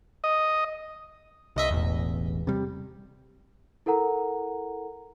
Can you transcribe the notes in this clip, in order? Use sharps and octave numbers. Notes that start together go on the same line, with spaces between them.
D#5
C2 G2 D#5 E5
E1 A1 E2
C3 G3
E4 A4 A#4 F#5 A#5